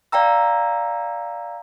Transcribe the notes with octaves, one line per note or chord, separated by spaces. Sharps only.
D5 F5 G5 A#5 E6